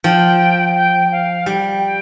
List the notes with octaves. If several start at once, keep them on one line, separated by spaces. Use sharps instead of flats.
F3 G5
G5
F5
G3 G5
G5